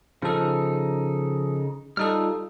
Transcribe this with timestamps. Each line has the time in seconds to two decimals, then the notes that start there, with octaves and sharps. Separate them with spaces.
0.22 C#3 F3 D#4 A4 F6
1.97 G3 D#4 F4 A4 D#6 F6